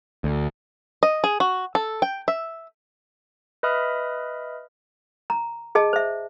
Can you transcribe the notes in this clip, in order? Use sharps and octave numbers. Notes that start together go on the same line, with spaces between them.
D2
D#5
G#4
F#4
A4
G5
E5
B4 D#5 E5 B5 D#6 F6
A#5
G#4 D#5 A5
C5 E5